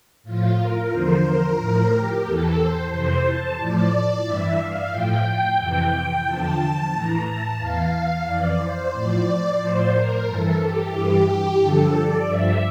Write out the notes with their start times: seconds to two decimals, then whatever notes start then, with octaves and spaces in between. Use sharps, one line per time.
0.23 A2 F3 F4
0.57 A#4
0.91 E2 D3 F3 C5
1.24 A#4
1.58 A2 F3
1.91 G4
2.24 E2 E3 A4
2.58 C5
2.91 F2 C3 E3 C5
3.25 A5
3.58 A2 F3 D5
4.24 G2 E3 E5
4.58 F5
4.91 A2 F3 G5
5.58 F2 C3 E3 G5
6.25 E2 D3 F3 A5
6.92 A2 E3 A#5
7.26 A5
7.58 E2 E3 F5
8.26 F2 E3 D5
8.59 C5
8.92 A2 F3 D5
9.59 A2 F3 C5
9.93 A#4
10.26 G2 E3 A4
10.59 G4
10.93 G2 E3
11.26 G4
11.60 G2 D3 F3 A4
11.94 D5
12.27 G2 F3 E5